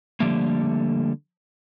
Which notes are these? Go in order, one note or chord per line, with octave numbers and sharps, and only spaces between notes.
D3 F3 G3 A3 A#3